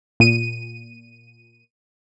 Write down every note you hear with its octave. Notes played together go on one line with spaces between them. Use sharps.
A#2 D#7